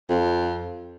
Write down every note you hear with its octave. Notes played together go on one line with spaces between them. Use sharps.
F2